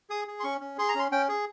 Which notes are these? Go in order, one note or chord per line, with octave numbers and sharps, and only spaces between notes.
G#4 D#6
G#4
C6
C#4 C#6
C#4
G#4 C6
A#5
C#4 C6
C#4 G5
G#4